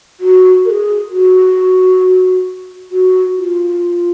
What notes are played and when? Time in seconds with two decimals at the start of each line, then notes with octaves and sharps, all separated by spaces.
0.20 F#4
0.64 A#4
0.69 G#4
1.10 F#4
2.91 F#4
3.36 F4